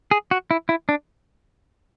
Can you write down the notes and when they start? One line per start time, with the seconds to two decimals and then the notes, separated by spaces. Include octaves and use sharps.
0.11 G#4
0.31 F#4
0.51 E4
0.69 E4
0.89 D4